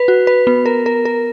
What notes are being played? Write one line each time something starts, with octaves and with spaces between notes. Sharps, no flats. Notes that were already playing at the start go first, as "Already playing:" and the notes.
Already playing: B4
F#4
B4
B3
A#4
A#4
A#4